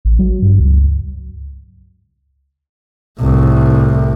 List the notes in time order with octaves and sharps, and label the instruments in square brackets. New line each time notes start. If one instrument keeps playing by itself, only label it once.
[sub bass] A1
F#3
G2
C#2
[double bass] C2 A2